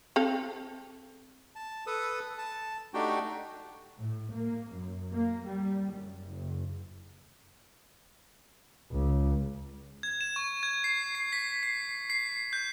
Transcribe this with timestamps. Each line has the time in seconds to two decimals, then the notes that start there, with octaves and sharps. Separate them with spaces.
0.16 C4 A4 F5
1.56 A5
1.87 A4 B4 D#6
2.38 A5
2.94 A3 D4 D#4 F#4 G4 G5
3.99 A2
4.30 A#3
4.72 F#2
5.13 A#3
5.46 G3
5.92 F#2
6.26 F#1
8.92 C#2
10.03 G#6
10.21 E7
10.36 C#6
10.63 G#6
10.84 C7
11.15 C7
11.33 B6
11.63 C7
12.10 C7
12.53 G6